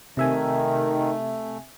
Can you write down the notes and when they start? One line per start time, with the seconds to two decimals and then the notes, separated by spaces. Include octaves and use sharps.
0.17 C3 D#3 A3 E5 G#5